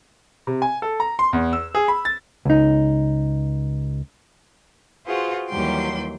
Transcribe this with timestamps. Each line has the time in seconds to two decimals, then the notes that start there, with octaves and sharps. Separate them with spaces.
0.47 C3
0.62 G#5
0.82 A4
1.00 A#5
1.19 C6
1.33 E2
1.53 E6
1.75 G#4
1.88 B5
2.05 A6
2.45 C#2 D#4
5.06 F4 F#4 G#4 B4 C5
5.49 D#2 E3 F#3 G3 G5 C6